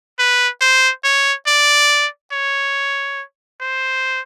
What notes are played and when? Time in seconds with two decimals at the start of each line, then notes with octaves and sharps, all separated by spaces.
0.19 B4
0.61 C5
1.04 C#5
1.47 D5
2.32 C#5
3.60 C5